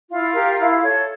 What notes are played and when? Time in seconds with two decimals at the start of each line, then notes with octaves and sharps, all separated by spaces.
0.09 E4 F4 F5
0.34 G4 A#4
0.59 E4
0.83 A4 C#5